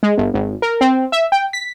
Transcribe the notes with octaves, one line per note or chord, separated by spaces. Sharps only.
G#3
G1
G#1
A#4
C4
E5
G5
B6